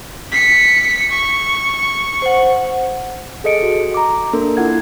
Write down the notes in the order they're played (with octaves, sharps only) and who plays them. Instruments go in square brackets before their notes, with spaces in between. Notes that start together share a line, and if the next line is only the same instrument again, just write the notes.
[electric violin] B6 C#7
C#6
[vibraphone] C5 F#5
[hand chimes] G#4 A4 D#5 C#7 D7
F#4
A#5 D6
A#3 D4 A4 A#4
A#3 E4 F4 F#5 G#6